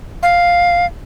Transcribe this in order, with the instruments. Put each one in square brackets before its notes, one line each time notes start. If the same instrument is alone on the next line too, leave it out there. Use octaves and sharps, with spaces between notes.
[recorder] F5